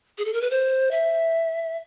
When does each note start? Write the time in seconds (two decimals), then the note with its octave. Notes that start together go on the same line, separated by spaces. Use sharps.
0.18 G#4
0.25 A4
0.33 A#4
0.41 B4
0.51 C5
0.91 E5